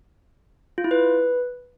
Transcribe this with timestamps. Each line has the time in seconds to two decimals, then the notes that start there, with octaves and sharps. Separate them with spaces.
0.78 F4
0.84 E4
0.91 B4